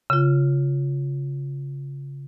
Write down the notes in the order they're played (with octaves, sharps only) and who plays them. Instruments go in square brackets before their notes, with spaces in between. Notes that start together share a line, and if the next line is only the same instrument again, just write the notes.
[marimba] C#3 F4